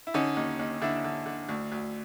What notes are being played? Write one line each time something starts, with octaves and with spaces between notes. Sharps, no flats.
E4
D3 C#4 D#4
D#2
D#2
D3 D4 E4
D3
D3
D2
D2